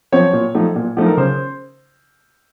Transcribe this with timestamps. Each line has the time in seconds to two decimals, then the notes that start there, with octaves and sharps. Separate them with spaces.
0.12 F3 C4 C#5
0.33 A#2
0.55 F3 A3 D#4
0.76 A#2
0.97 F3 A3 D#4
1.06 A#4
1.17 C#3 C5